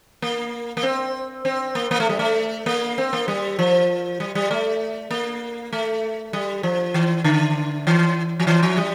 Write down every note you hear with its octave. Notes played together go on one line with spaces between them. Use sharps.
A#3
A#3
C4
C4
A#3
A#3
A3
G3
A3
A#3
C4
A#3
G3
F3
G3
G3
A3
A#3
A3
G3
F3
E3
D3
E3
F3
E3
F3
G3